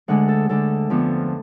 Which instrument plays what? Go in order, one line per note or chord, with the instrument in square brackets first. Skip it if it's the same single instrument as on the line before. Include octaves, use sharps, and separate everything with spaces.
[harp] D2 D3 G#3 F#5
A4
D2 D3 G#3 A4
F2 D3 F3 B3 D4